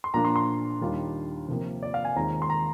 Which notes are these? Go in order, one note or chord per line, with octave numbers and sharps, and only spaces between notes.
C6
A#2 F3 A#3 D4 F4 A#5
C6
C6
D#2 D#3 G3 D4 F4
C3 F3 A#3
D5
F5
G#5
D#2 D#3 G#3 C4 F4 A#5
C6
A#5